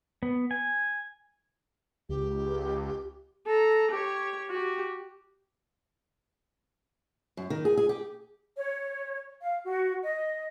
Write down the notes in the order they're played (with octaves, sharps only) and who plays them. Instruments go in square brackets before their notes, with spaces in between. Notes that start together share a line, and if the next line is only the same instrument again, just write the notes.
[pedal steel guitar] B3
G#5
[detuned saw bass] C#2 [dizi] G4
[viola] A4 A#5
G4 C#5
F#4 G4
[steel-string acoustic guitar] F#2
D#3
G#4
G#4
G4
[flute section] C#5
F5
F#4
D#5